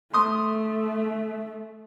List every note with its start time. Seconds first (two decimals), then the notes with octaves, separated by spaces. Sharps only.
0.14 A3 C6 D#6